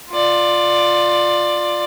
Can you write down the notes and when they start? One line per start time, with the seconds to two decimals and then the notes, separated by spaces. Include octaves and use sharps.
0.11 F4 D5